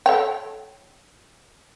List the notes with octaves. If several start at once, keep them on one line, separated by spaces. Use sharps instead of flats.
A4 C#5 G5